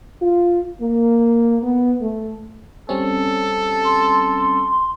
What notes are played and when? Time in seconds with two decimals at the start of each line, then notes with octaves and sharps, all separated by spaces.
0.21 F4
0.81 A#3
1.63 B3
2.01 A3
2.89 G3 C4 C#4 A4
3.84 C6